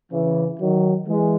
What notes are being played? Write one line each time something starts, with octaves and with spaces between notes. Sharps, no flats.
C#3 E3
D#3 F#3
E3 G#3